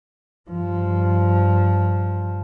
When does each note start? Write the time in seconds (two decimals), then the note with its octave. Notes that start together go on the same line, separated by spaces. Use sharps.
0.50 G2 F3